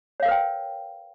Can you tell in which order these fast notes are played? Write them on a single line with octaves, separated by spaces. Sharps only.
C#5 F5 A#4 B4 G5